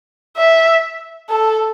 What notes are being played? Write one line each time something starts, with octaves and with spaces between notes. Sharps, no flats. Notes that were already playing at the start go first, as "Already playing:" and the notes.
E5
A4